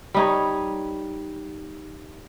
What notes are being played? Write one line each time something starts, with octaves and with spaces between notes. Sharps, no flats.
G3 D#4 C#5